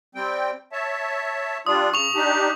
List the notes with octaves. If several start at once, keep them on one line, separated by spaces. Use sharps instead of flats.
G3 C4 G5
C#5 E5 A5
G3 D4 F4 D#6
C#3 C#6 F7
D4 D#4 G4